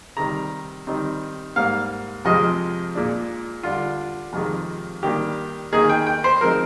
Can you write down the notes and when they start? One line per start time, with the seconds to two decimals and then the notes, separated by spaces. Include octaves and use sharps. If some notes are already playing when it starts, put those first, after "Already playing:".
0.17 C3 D#3 G3 A#5
0.87 D#3 G3 C4 D#4
1.56 G#2 G3 A#3 F5
2.25 F2 C3 F3 G#3 C4 D#5
2.95 A#2 G#3 D4
3.63 D3 G3 D4 F4
4.33 F2 C3 D#3 G#3
5.03 D#3 G3 A#3 D4 G4
5.73 D#3 A#3 D#4 G#4
5.89 G5
6.07 G5
6.24 C5
6.41 F3 G#3 C4 D#4 A#4